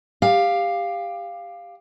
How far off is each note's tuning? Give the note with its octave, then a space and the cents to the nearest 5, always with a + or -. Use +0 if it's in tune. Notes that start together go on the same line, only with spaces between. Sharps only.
G4 +20 F5 +0